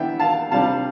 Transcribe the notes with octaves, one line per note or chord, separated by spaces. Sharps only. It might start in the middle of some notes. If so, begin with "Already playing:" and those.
Already playing: E3 B3 D4 E5 G5
F5 A5
C3 G3 D4 F5 A5